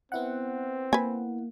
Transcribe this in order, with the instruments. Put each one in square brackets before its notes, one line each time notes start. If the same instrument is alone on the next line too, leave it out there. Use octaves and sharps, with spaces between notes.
[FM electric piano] B3 E4 F#5 [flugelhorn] C4
[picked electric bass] A#3 [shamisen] B4 G#5